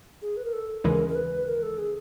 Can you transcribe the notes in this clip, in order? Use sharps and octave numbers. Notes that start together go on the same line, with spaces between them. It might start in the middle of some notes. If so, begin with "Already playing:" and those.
G#4
B4
A#4
A4
D#2 C#3 E3 G#3 A#4
A#4
B4
A#4
A4
G#4